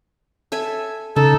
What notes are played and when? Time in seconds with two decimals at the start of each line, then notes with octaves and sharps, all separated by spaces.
0.52 A4 E5 G#5
1.16 C#3 D#4 A4